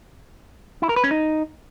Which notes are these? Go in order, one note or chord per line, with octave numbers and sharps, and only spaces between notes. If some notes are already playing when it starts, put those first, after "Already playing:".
E4
A#4
B4
C#4
D#4